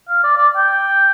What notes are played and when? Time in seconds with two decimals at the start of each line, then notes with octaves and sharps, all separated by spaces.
0.09 F5
0.23 D5
0.37 D5
0.57 G5